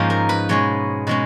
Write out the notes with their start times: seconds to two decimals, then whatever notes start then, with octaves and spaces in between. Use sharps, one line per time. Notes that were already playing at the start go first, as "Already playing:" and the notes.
Already playing: G#2 F3 A#3 C#4 D#4 F4
0.10 A#4
0.29 B4
0.49 B2 G#3 C#4 C#5
1.07 B2 G#3 C#4 B4